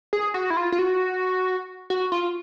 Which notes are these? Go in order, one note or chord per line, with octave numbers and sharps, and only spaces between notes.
G#4
F#4
E4
F4
F4
F#4
F#4
F4